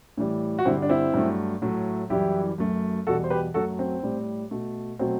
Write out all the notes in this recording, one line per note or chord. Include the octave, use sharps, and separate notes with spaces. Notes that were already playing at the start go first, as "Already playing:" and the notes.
A2 E3 G3
F#4
G2 D3 G3 C4 E4
D4
C4 E4
G2 F#3 A3
A2 F#3 A3
F#2 E3 G3 E4 G4
F#2 F#3 A3
E2 B2 G3 F#4 A4
C5
G4 B4
F#2 F#3 A3 F#4 A4
C4
A2 G3
B2 A3
B2 F#3 A3 C4